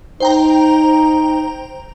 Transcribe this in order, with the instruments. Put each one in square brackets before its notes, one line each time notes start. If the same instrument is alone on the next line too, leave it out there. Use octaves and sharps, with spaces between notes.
[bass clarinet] D#4 [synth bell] C5 G5 A#5